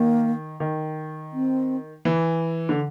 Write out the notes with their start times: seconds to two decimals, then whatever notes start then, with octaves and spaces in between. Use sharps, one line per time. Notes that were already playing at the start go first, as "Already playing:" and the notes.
Already playing: D#3 A#3
0.60 D#3
1.33 C4
2.05 E3
2.69 D3